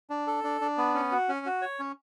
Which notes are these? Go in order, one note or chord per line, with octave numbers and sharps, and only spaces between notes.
D4
A4
D4
D4
B3
C#4
F#4
C#4
F#4
C#5
C#4